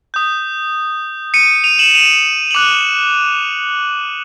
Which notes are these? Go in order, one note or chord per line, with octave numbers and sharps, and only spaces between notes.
D#6 G6
C#7 D#7
D#7 F7
E7 F#7
D#7 F7
F#7
D6 F#6 D#7 F7